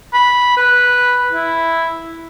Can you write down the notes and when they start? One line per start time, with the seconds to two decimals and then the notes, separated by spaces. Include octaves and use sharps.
0.13 B5
0.57 B4
1.33 E4